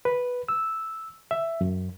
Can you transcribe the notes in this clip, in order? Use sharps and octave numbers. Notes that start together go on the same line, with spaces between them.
B4
E6
E5
F#2